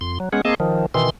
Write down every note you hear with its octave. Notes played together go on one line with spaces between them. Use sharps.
F2 C6
F#3
G#3 B3 C#4 G#4 F#5
A#3 C4 G#4 D#5 A5
D#3 F3
B2 D#3 E3 C6